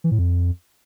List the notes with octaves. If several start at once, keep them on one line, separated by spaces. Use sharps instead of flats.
E3
A2
F2